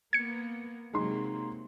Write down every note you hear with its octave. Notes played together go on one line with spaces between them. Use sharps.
A#3 B3 G#6 C#7
C3 F#3 G#3 A#3 D#4 C6